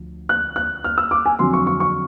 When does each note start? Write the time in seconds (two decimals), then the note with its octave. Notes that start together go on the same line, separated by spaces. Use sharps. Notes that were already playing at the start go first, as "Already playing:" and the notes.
Already playing: D2 D3 F3
0.29 F#6
0.56 F#6
0.84 F6
0.98 E6
1.11 D6
1.26 G#5
1.39 F2 D3 F#3 C6
1.53 C#6
1.67 C#6
1.80 C#6